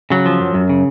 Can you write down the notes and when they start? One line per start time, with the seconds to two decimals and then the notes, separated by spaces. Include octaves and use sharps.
0.10 C#3 F#3
0.26 F3
0.40 F#2
0.54 F#2
0.69 C#3